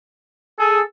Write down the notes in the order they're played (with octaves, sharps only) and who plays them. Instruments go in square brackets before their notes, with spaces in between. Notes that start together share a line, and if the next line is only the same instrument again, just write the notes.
[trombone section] G#4 [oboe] A4